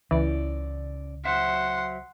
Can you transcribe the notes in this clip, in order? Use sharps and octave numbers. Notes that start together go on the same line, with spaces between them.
C#2 C#3 E3 D5
F#3 C5 E5 F#5 C6